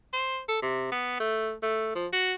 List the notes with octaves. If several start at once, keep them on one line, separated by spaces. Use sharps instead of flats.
C5
A4
C3
B3
A3
A3
F3
F#4